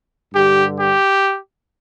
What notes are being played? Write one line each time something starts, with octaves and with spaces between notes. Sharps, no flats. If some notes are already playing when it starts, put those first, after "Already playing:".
G2 D3 G4
G4